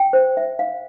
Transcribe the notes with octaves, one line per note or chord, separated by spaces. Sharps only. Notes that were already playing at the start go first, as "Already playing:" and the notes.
Already playing: G5
C5
E5
F5